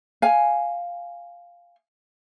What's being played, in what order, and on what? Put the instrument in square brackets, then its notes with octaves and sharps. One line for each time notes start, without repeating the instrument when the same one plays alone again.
[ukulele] F5 G#5